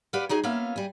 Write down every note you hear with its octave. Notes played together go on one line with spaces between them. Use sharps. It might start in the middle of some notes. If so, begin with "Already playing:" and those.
G4 B4 D5 F5 F#5
F#3 D#4 G#4 G#5
A#3 B3 C#4 F4 E5 F5
G3 G#5